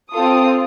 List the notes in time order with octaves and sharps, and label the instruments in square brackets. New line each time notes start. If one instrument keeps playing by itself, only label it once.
[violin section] C4 F4 A4 D#6